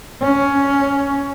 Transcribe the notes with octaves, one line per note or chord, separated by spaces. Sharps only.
C#4